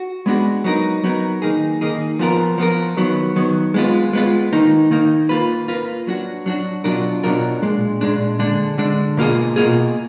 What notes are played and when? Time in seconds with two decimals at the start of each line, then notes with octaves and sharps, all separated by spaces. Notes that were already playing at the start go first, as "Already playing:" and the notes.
Already playing: F#4
0.26 G#3 B3 D4 F#4
0.64 F#3 B3 D#4 A#4
1.04 F#3 B3 D#4 A#4
1.42 D#3 A#3 D#4 G#4
1.81 D#3 A#3 D#4 G#4
2.19 F3 B3 F4 A#4
2.58 F3 B3 F4 A#4
2.97 D#3 F#3 B3
3.36 D#3 F#3 B3
3.74 G#3 B3 F4
4.13 G#3 B3 F4
4.53 D#3 A#3 D#4
4.91 D#3 A#3 D#4
5.29 A#3 F4 B4
5.68 A#3 F4 B4
6.07 F#3 D4 F#4
6.46 F#3 D4 F#4
6.84 B2 F#3 D4 F4 A#4
7.23 B2 F#3 D4 F4 A#4
7.62 A#2 G#3 D4
8.01 A#2 G#3 D4
8.39 D3 G#3 D4
8.78 D3 G#3 D4
9.17 B2 A#3 F4 G#4
9.56 B2 A#3 F4 G#4